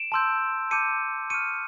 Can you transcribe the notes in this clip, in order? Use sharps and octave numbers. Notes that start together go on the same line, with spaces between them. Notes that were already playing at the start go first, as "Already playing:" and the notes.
Already playing: D7 E7
A5 C6 E6 G6
A5 D6 G6 C#7 D#7
C#6 F6 C#7 D#7